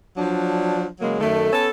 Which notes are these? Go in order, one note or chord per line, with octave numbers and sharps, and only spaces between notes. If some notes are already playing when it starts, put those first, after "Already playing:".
F3 F#3 D4
C#3 F#3 G#3 A#3
F#2 D#3 A3
B3 C#4 A4